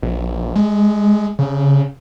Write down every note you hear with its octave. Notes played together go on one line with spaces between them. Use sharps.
A#1
G#3
C#3